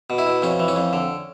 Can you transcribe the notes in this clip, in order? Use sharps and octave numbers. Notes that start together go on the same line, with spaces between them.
B2
E4
B2
F2 C#4
E3
C#4
F2
D3